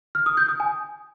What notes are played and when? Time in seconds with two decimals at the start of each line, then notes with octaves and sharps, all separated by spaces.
0.15 F6
0.26 D#6
0.37 G6
0.49 D#6
0.60 G#5